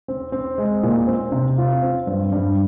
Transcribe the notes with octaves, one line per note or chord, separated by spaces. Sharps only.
C4
C4
G#3
A#2
C4
C3
F4
C4
G2
G2